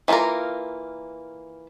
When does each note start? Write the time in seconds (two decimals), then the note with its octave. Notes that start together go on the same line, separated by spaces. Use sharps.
0.08 E3 A#3 E4 F4 A#4